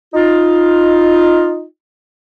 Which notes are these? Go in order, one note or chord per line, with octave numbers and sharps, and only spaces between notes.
D#4 F4